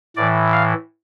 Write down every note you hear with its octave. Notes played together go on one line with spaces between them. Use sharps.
A2 E3 D5
F5